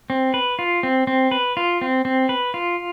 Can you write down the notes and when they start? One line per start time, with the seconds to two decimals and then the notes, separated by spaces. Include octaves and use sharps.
0.10 C4
0.34 B4
0.59 F4
0.83 C4
1.07 C4
1.31 B4
1.57 F4
1.81 C4
2.05 C4
2.29 B4
2.54 F4